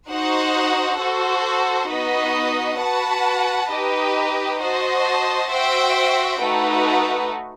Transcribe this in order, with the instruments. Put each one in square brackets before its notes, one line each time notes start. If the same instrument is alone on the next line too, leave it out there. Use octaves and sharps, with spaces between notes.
[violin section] D#4 F#4 C5 F#5
F#4 A4 C5
B3 D#4 F#4 B4 D#5
F#4 B4 F#5 A5
D#4 G4 B4 D#5
F#4 C5 D#5 A5
F#4 C5 E5 G5
A3 D#4 F#4 B4